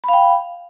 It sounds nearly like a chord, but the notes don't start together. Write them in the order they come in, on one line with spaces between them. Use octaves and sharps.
B5 F5 G5